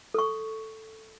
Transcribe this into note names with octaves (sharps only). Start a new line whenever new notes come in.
A4 C#6